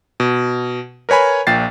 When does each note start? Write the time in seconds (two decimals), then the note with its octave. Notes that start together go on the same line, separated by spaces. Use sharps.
0.20 B2
1.09 A#4 B4 C#5 G#5 B5
1.47 A#1 A#2 G5 A6 C7